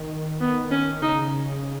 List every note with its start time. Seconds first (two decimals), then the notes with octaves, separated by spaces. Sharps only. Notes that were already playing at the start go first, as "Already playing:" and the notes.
Already playing: D#3
0.41 B3
0.71 C#4
1.02 C#3 D#4